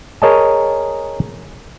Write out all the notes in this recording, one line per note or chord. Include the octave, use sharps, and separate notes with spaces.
G#4 A#4 C#5 D#5 G#5 A5